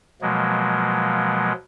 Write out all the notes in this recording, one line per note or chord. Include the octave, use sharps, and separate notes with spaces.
B2 F3 F#3 G#3 A#3